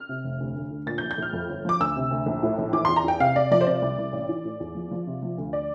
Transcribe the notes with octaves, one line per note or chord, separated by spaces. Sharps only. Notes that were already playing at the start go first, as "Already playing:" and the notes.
Already playing: F6
C3
F1
D2
D2
D3
A#2 A6
G6
A#1
G6
A#1 F6
F2
G1
F3 D6
D2 E6
C3
D2
A#1
A2
A#1
E3 D6
E2 C6
A#5
E2 G5
C3 F5
C3 D5
F3 D5
C5
C3 D5
C2
C2
A1
E3
A2
E2
F3
F3
C3
F3
D2
D5